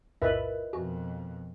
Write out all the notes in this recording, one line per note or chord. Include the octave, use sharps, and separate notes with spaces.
B1 F2 A2 F4 A#4 B4 D#5 E5
F2 B2 F#4 G#5